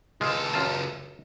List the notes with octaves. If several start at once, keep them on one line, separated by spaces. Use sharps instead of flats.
C#2 G#3 F4 A4
F#2 F4 A5